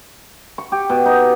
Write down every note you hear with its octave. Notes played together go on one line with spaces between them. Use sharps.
C#6
G4
B2
D#4